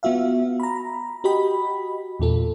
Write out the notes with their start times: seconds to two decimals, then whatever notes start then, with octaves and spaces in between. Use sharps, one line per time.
0.03 B3 F4 F#4 E5 F5
0.60 A#5 B5
1.24 F#4 G4 D#5 G5 B5
2.20 E2 A#2 F4 A4